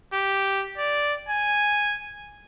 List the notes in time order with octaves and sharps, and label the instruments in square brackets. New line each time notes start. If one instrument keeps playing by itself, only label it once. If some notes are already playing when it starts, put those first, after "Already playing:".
[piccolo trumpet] G4
D5
G#5